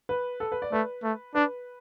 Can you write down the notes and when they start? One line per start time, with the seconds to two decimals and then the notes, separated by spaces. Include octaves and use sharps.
0.09 B4
0.40 A4
0.52 B4
0.62 D5
0.72 A3 B4
1.03 A3
1.35 D4 B4